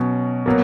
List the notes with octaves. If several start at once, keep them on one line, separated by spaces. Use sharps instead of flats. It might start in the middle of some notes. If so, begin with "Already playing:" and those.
Already playing: B2 F#3 C#4
B2 F#3 A#3